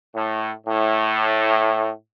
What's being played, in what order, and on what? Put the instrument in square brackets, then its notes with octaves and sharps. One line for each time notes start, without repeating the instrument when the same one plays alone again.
[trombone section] A2
A2